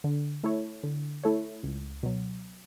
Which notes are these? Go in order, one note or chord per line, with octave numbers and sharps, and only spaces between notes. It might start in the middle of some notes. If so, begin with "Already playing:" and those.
D3
A3 E4 A4 C#5
D3
A3 E4 A4 C#5
C#2
B2 F#3